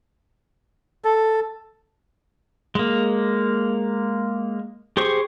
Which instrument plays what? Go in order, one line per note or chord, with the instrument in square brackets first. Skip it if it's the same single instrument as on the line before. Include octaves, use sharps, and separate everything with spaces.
[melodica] A4
[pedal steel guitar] G#3 A#3
G4 G#4 C5 C#6